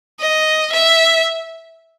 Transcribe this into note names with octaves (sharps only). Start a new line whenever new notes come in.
D#5
E5